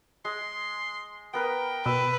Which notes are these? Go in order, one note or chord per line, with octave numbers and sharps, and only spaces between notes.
G#3 C6
B3 A#4 B4 G5
B2 B4 E6